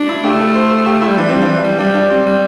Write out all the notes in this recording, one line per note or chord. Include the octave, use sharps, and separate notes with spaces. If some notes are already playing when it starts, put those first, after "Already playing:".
Already playing: D4
E4
A3 G4
A4
C5
A4
G4
E4
G3
E3 D4
G3 C4
D4
E3
G3
G3 D4
D4
G3 C4
G3